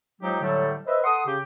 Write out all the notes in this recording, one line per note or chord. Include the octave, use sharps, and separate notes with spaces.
F3 F#3 G#3 D#4 G4
A2 D3 F#3 G3 A3
B4 C5 D#5 E5
A4 F#5 C6 D#6
C#3 G4